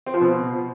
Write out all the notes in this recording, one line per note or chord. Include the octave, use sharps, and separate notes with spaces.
C4
F3
B2